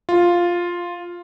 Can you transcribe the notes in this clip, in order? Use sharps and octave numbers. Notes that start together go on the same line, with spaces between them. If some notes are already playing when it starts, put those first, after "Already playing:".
F4